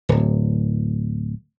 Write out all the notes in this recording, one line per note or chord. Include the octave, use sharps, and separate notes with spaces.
D1